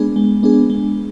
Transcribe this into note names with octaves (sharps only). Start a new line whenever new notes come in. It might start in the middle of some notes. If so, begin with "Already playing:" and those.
Already playing: G#3 B3 D4 G#4
G#3
B3 D4 G#4
G#3